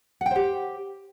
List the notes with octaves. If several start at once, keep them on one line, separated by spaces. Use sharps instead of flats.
G4 C5 F#5 G5